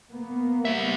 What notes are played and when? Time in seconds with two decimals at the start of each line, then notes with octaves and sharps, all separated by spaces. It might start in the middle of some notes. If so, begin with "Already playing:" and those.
0.11 A#3 B3
0.65 G3 E5